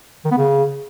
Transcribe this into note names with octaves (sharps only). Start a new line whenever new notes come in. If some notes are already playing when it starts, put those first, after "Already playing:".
D#3
B3
C#3